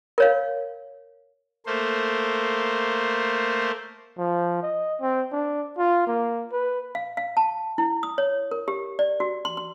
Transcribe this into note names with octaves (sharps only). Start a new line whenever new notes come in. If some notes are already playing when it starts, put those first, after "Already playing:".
A#4 C#5 F5
A3 A#3 C5
F3
D#5
C4
D4
F4
A#3
B4
F5
F5
A5
E4
D#6
C#5
A#4
G4
D5
F#4
C6
C6